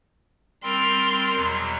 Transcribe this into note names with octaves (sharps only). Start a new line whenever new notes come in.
G3 C4 A#4 C6 F6
E2 B2 F#3